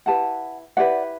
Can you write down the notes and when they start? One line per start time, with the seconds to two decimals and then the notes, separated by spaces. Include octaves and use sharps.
0.06 E4 G4 B4 F#5 A5
0.77 E4 G4 B4 D5 F#5